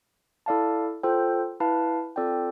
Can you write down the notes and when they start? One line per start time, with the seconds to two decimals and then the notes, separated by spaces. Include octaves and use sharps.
0.46 E4 A4 D5 F5 A5
1.03 F4 A4 C5 G5
1.60 E4 B4 F5 A5
2.16 C4 F4 A4 D5 G5